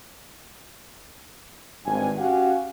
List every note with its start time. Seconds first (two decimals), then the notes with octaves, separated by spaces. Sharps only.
1.86 G#1 G2 G#5
2.17 C#4 F#4 G4 F5 F#5 G#5